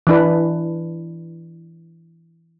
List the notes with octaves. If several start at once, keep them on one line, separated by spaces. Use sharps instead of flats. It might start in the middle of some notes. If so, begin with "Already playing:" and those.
E3 D4 B4